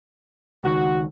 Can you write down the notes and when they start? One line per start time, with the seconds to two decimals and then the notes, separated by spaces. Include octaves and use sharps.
0.64 C#2 D#3 F#4